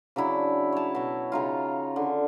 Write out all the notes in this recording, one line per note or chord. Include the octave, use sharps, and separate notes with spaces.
C#3 F#3 D4 E4
C#5 A5
B2 C#5
C#3 D#4 F4
D3